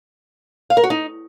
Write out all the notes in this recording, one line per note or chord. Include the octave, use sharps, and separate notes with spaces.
F5
A#4
F#4
D#4